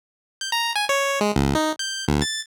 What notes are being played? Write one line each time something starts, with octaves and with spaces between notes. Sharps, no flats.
G6
A#5
G#5
C#5
G#3
C#2
D#4
G6
D2
A6